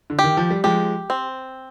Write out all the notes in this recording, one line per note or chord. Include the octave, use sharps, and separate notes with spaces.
D3
G4
D#3
F3
G3
F3 G#3 G4
C4